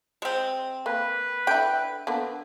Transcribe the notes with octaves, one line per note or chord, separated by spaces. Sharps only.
G#3 C4
A#3 B4
D3 E4 G5
D3 A#3 B3